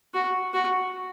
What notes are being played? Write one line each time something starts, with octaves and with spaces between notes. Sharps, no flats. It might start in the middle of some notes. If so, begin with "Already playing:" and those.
F#4
F#4